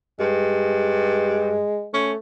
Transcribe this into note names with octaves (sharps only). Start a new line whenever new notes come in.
G2 G#3
A3 C#4